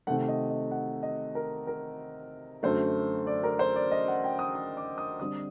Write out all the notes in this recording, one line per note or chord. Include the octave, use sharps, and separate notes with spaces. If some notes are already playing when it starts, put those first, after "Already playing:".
C3 D#3 A3 F#5
D#5
D#5
F#5
D#5
A#4
A#4
F#2 D3 A3 C5
D5
A#4
C5
D5
D#5
F#5
G5
D#6
D#6
D6
D#6
D3 G3 C4 D#6